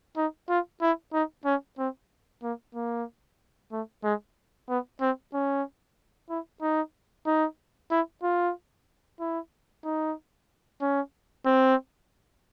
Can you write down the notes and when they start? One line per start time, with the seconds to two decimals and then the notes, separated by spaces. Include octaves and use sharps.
0.17 D#4
0.49 F4
0.82 E4
1.13 D#4
1.45 C#4
1.78 C4
2.43 A#3
2.75 A#3
3.72 A3
4.04 G#3
4.69 B3
5.01 C4
5.33 C#4
6.29 E4
6.62 D#4
7.26 D#4
7.91 E4
8.23 F4
9.20 E4
9.85 D#4
10.81 C#4
11.46 C4